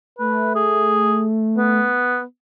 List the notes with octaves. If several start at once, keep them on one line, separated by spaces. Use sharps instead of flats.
A3 B4
G#4
B3